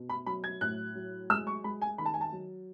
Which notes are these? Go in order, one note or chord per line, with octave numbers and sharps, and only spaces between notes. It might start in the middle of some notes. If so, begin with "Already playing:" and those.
Already playing: B2
B5
F#3 B5
G#6
A2 F#6
F#3
G#3 E6
C#6
G#3 B5
G#5
D#3 B5
A5
G#5
A5
F#3